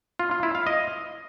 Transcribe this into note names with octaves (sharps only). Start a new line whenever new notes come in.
F4
F4
E4
F5
D#5